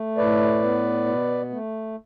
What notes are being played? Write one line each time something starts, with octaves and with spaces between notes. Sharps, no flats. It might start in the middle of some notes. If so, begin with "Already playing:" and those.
Already playing: A3
A2 B4 D5
B3
B2
A3